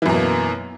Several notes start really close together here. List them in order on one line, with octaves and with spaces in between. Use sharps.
E3 F#2 B2 A#3